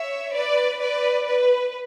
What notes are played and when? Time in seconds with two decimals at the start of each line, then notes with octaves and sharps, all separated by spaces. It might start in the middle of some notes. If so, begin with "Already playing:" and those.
Already playing: C#5 E5
0.34 B4 D5
0.80 B4 D5
1.26 B4